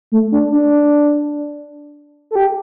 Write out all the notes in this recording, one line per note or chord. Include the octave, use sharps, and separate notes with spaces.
A3
D4
D4
A4
G4